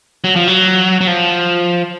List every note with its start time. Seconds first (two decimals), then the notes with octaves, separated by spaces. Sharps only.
0.24 F#3
0.36 F3
0.48 F#3
1.01 F#3
1.07 F3